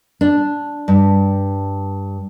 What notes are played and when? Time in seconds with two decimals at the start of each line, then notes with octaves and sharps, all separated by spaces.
0.21 D4
0.88 G2